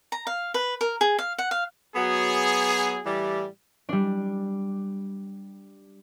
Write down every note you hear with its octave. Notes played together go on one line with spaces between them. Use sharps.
A#5
F5
B4
A#4
G#4
F5
F#5
F5
F#3 B3 G#4
A2 E3 G3
G3 D4